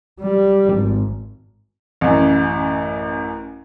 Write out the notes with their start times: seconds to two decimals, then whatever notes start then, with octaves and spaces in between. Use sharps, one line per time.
0.21 G3
0.74 G#1
2.01 A1 F#2